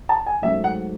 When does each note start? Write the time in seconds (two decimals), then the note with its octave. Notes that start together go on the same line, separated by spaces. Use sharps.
0.09 A5
0.26 G#5
0.42 G#2 F#3 A3 E5
0.64 F#5